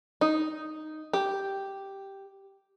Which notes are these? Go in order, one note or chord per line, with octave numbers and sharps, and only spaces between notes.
D#4
G4